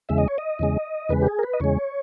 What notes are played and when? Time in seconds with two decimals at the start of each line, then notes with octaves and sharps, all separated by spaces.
0.09 E2 C#3 G#3 E5
0.18 D#5
0.28 C#5
0.38 D#5
0.59 E2 C#3 G#3
1.09 E2 C#3 G#3 B4
1.22 G4
1.27 G#4
1.39 A#4
1.43 B4
1.53 D#5
1.60 E2 C#3 G#3 C#5